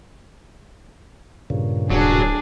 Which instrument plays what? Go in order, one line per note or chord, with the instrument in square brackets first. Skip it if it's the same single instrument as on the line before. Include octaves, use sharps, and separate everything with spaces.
[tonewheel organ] G2 A#2 C#3
[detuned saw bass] D1 [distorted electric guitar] F#3 [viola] D4 G#4